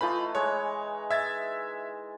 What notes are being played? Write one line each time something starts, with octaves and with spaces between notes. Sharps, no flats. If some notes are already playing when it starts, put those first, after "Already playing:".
E3 A3 D#4 F4 B5
G#3 C#5
E5 G#6 A6